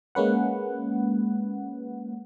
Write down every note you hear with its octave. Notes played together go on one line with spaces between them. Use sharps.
G#3 A#3 C#4 B4 F#5